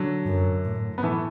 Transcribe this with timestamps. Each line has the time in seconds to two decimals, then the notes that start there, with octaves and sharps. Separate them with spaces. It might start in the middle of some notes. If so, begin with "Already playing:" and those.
Already playing: D3 F#3
0.26 F#2
0.65 A2
0.98 B3
1.03 E3 A3